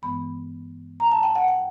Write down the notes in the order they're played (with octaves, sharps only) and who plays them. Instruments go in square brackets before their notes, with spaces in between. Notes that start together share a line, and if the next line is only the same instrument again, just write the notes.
[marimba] G2 E3 G#3 B3 B5
A#5
A5
G5
F#5
G5